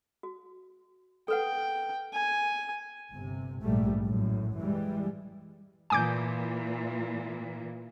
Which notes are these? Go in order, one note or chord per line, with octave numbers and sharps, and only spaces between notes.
F#4
A4 B4 F#5 G5
G#5
G1 C3
A#1 G#2 G3 A3
F#2 A2
E3 G3 G#3
A#2 E3 G#5 D6 G6